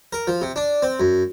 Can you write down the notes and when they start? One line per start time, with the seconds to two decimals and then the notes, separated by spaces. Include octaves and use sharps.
0.13 A#4
0.27 F3
0.41 C3
0.56 D4
0.82 C4
1.00 F#2